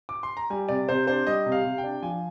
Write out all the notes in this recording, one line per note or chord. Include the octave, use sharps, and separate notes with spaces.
D6
C6
A#5
G3 G#5
C3 D5
C3 C5
D4 C5
G3 D#5
C3
F5
C3
G5
D4
F3 G#5